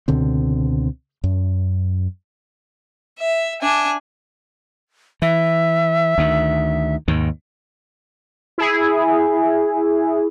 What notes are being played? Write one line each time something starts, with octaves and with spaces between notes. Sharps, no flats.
C#2 B2 D3 C4
F#2
E5
D4 G#5
E3 E5
D2 D#3
D#2 G#2 D#3
E4 G#4